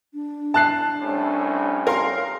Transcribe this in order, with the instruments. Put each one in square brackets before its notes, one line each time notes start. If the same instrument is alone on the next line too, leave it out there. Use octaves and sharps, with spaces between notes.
[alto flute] D4
[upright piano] A5 F#6 C7
[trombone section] C2 A2 C#4
[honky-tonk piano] A#4 F5 C6